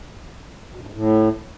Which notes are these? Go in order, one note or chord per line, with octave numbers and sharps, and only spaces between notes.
B2
G2
G#2
A2